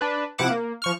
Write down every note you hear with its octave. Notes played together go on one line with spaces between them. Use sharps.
D4 B4
C3 F3 E4 F#5 D6 E7
A#3
F3 C#6 F6